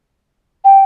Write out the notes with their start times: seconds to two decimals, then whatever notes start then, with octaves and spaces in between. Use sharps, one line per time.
0.64 G5